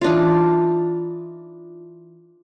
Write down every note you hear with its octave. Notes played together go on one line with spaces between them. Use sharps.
E3 D4 D#4 F4